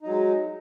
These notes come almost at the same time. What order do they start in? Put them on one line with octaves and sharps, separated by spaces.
D#4 F#3 G#3